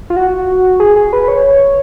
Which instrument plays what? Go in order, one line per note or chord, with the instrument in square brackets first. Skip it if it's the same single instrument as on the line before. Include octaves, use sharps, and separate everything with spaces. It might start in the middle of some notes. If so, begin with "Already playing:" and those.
[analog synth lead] F4
F#4
G#4
G#4
B4
C#5